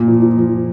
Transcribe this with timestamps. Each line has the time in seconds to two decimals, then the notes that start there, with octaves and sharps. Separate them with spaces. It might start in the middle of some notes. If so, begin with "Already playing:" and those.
Already playing: A#2 A#3
0.08 F3
0.22 F3
0.37 F3